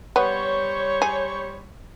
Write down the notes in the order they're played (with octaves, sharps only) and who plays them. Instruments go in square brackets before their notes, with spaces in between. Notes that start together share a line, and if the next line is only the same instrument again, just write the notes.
[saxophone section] G3 C5 C#5 [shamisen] B3
[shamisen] G#4